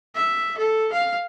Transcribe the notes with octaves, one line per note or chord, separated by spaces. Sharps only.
E5
A4
F5